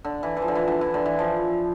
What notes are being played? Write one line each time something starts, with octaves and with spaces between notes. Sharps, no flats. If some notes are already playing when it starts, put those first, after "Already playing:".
D3
E3
E3
F3
D3
E3
D3
E3
D3
E3
F3